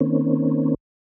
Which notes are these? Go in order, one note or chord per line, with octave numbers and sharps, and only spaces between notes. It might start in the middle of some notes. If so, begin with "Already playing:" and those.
D#3 A#3 C4 C#4